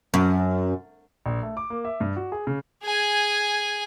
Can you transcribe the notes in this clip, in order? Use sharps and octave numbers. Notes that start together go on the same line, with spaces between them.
F#2
A#1
A3
D6
A#3
E5
G2
F#4
G#4
C#3
G#4 G#5